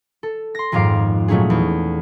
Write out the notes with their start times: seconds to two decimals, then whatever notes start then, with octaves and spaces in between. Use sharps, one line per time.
0.23 A4
0.55 C6 A#6
0.72 D#1 F2 G#2 F5 D6 C7
1.28 A#2 F#3 A3 C#4 D#4 G#4
1.50 E2